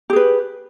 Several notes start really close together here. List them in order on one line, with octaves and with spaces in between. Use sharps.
G4 G#4 B4